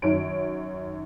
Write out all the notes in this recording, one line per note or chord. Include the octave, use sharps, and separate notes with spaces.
F#2 D#3 C#5 D7